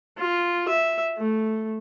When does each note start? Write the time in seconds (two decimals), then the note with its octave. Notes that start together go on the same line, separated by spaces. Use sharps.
0.18 F4
0.68 E5
1.18 A3